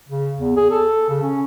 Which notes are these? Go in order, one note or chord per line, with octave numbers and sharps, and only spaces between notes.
C#3
E2
G#4
A4
C#3
C#4